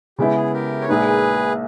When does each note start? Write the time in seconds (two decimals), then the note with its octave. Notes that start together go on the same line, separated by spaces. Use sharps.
0.18 C#3 G#3 B3 E4 G4
0.35 G#4
0.53 G4 A#4
0.81 C#5
0.89 A#1 A#2 G#3 D#4 G#4 B4